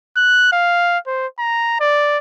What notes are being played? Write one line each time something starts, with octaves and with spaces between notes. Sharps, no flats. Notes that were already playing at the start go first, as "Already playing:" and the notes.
F#6
F5
C5
A#5
D5